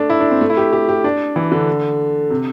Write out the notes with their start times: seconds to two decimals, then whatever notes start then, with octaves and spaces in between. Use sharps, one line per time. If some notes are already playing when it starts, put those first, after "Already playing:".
Already playing: A3 D4
0.10 E4
0.20 D4
0.31 C4
0.41 A3
0.50 E4
0.57 G4
0.73 G4
0.89 G4
1.04 D4
1.36 E3
1.52 D3
2.30 C3